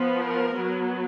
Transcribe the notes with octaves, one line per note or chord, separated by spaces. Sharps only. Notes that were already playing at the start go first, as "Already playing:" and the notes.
Already playing: F3 B3
A#4
F#3 B3